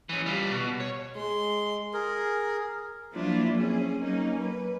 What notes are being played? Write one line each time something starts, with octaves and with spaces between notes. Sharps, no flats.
E3 C#4
G3 F4
B2
C#5
G#3 C6
G#4 A#4
F3 F#3 A#3 D4 E4 F4
C4 C#4 G#4
F#3 A#3 C#4 D#4
B4